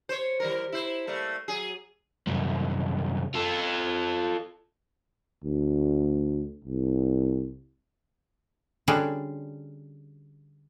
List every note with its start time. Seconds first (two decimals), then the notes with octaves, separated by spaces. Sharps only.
0.09 C5 C#5
0.40 E3 G3 A#4
0.72 E4 C5
1.07 G3 A3 A#3
1.48 F#3 G#4
2.27 C2 F#2
3.34 F4 A4
5.44 D2
6.64 C2
8.88 D3 G3 C#4 D4 F#4 G#4